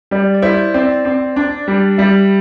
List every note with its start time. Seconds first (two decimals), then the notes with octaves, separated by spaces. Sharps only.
0.11 G3 D5
0.35 D5
0.42 E4 C5
0.74 C4 D5
1.05 C4
1.36 D4
1.68 G3
1.98 G3 E5